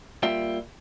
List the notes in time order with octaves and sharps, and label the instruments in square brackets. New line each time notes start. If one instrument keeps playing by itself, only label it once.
[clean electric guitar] G3 A#3 F4 E5 G5